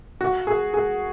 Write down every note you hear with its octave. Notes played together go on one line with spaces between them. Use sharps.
F#4
G#4
G#4